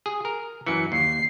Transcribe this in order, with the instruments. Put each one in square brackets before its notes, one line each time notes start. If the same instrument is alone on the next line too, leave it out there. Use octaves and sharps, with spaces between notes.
[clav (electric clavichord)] G#4
A#4
[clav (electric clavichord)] F#2 E3 [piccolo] C#7
[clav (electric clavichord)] D#2 [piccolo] C7